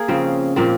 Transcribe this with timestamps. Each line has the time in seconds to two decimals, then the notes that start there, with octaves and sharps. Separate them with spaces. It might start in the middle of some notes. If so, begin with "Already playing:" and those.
Already playing: A#3 G#4 A#4
0.08 C#3 F3 C4
0.56 A#2 F3 C4